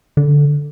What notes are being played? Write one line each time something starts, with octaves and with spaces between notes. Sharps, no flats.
D3